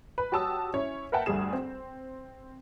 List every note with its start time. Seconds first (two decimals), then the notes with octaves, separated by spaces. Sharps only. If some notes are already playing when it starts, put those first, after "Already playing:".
0.18 B4
0.32 F#4 G4 C#5 A5 D#6 E6
0.74 C#4 E4 C#5
1.12 A#4 B4 E5 F#5 G5 A5
1.26 D2 G2 G3 A3 G#4 E7
1.53 C4